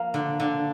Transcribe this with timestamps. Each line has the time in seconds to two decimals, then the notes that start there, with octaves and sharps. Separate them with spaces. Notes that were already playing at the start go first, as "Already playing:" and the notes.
Already playing: F3 A#3
0.14 D3
0.40 D3